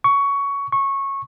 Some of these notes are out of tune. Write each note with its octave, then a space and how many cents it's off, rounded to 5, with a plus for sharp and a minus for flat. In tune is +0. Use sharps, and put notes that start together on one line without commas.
C#6 +15
C#6 -15